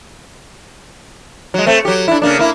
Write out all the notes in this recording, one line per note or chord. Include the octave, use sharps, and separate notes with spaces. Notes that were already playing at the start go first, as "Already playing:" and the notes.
F#3 G#3
A3 C4
F#3 G4
D4 E4
C#3 A#3 D4
A#3 E4